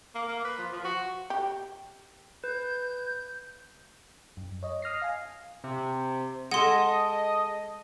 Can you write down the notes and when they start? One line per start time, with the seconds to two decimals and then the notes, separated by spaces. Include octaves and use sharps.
0.15 A#3
0.28 A#3
0.45 B4
0.58 F3
0.73 F3
0.84 F#4
1.30 G4
2.44 B4 G6
4.37 F#2
4.63 C#5 D#5
4.82 D#6 F6 A#6 C7
5.02 F5 G#5
5.64 C3
6.51 G#3 A4 D#5 F#5 C6